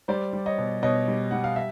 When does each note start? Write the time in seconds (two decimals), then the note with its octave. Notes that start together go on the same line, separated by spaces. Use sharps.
0.08 G3 C5 D5
0.33 G3
0.46 C#5 D#5
0.58 B2
0.82 B2 C#5 D#5
1.08 G3
1.31 G3 F#5
1.44 F5
1.56 E5